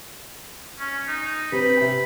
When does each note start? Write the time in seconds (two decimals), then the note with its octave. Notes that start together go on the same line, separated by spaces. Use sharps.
0.79 C#4
1.07 D#4
1.52 C4 G4 B4 B5
1.81 C3